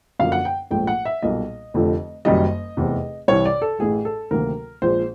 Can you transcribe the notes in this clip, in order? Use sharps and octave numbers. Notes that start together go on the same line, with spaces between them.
F#2 D3 F3 A#3 F5
F#5
G5
A#1 G#2 F3 A3 G5
F#5
E5
B1 A#2 G3 A#3 D#5
F1 F2 D3 F3 A3
F#1 F#2 D#3 G3 D#5
F1 E2 C3
C2 C3 E3 C#5
D5
A4
A1 A2 E3 A3 G#4
A4
D2 C3 D#3 F#3 A#3 A#4
A#1 A#2 F3 G#3 C5